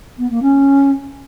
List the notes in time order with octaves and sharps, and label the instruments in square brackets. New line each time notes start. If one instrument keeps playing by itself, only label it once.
[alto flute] B3
A#3
C#4